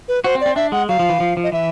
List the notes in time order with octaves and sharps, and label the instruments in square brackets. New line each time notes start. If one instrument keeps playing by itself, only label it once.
[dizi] B4
[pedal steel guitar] F#4 [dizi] C5
[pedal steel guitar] C4
[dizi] D5
[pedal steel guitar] C4
[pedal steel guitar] D4 [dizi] E5
[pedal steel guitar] G#3 [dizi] F#5
[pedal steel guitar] F#3 [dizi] F5
[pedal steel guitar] F3
E3
F3
F3
[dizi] D#5
[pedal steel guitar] E3 [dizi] E5